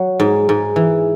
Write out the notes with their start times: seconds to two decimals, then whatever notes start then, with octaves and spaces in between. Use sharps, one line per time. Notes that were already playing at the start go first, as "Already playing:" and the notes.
Already playing: F#3
0.20 G#2
0.49 G#2
0.76 E3